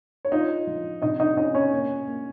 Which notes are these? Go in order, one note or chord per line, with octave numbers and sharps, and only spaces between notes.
C#5
D#4 F4 D#5
F3
C3 D#4 D#5
D#4 D#5
C#4 D#4 D#5
C#4 C#5
A#3
A#3